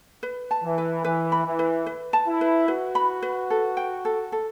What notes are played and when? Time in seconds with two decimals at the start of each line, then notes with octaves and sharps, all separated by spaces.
0.23 B4
0.51 A5
0.64 E3
0.78 B4
1.04 E3 B4
1.32 B5
1.46 E3
1.59 B4
1.86 B4
2.13 A5
2.28 E4
2.41 B4
2.68 F#4 B4
2.95 B5
3.22 B4
3.50 A4
3.77 G5
4.05 A4
4.32 A4